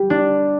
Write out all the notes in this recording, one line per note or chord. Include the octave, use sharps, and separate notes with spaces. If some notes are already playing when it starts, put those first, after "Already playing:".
Already playing: G3 G4
D4